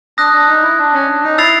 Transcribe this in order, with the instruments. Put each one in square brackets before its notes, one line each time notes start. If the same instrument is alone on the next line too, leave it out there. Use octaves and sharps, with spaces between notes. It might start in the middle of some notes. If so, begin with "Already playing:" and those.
[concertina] D4 [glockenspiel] D#6 F#6 A#6
[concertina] D4
D#4
E4
D4
C#4
D4
D#4
[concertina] E4 [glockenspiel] E6 A6 C7 F7